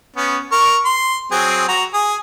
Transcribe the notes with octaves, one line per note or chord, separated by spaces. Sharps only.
B3 C#4
A#4 C#6
C6
F#3 C4 G#4
F#4 A#5
G#4